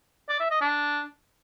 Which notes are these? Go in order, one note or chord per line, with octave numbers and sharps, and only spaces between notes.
D5
E5
D#5
D4